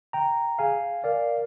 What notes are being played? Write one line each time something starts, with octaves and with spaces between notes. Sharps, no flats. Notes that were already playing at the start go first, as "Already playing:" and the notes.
G5 A#5
G#4 F5 G#5
A#4 D5 F5